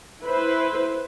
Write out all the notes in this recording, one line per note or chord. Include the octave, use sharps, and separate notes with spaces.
E4 B4 C5